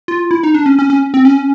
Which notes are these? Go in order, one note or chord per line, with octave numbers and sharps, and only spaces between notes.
F4
E4
D#4
D4
C#4
C#4
C#4
C4
C#4